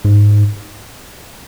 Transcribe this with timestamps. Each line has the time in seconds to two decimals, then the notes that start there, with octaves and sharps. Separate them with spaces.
0.05 G#2